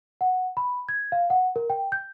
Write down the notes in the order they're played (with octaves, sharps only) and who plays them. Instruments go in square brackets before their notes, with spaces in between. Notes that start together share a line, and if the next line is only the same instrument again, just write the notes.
[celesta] F#5
B5
G#6
F5
F#5
A#4
G5
G6